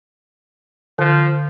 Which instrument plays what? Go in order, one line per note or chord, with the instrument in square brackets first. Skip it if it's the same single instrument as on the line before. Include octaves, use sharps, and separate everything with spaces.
[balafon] D3 [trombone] F3